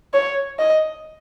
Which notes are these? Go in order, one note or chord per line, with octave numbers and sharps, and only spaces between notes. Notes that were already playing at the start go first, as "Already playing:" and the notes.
C#5
D#5